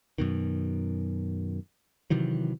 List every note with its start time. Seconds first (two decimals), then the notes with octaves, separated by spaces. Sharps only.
0.18 F#2 B2 D#3
2.10 C3 D#3 E3 F#3